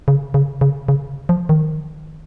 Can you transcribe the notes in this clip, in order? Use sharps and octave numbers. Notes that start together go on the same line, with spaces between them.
C#3
C#3
C#3
C#3
F3
D#3